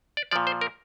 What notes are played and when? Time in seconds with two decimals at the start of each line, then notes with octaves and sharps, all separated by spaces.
0.17 D5
0.31 A#2 F3 D5
0.47 C5
0.61 A#4